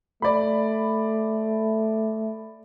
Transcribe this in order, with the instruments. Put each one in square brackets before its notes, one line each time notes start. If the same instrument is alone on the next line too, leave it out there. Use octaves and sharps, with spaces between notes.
[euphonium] A3 [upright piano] D5 B5